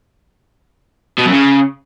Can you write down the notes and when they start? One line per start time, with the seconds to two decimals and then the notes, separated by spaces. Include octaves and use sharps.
1.18 B2
1.26 F#2
1.33 C#3